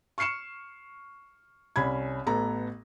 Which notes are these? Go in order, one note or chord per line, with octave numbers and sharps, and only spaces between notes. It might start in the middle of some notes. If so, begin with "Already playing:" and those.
C#6 F6 C7 C#7 E7
C2 C#4 B5 G#6
A1 B3 A4 A#5